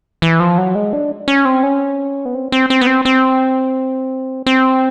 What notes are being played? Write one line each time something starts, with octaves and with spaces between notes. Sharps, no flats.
E3
F3
F#3
G#3
D4
C#4
C4
C#4
B3
C4
C4
C4
B3
C4
C4
C4